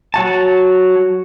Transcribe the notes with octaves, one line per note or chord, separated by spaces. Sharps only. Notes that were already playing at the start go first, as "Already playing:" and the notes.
F#3 F#4 A5